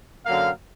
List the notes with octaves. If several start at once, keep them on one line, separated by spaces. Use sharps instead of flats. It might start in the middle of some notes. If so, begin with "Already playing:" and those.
F#2 D3 F#3 A#3 F5